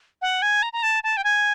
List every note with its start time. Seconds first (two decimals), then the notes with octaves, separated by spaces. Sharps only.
0.22 F#5
0.42 G#5
0.63 A#5
0.73 A#5
0.83 A5
1.03 A5
1.17 G5
1.24 G#5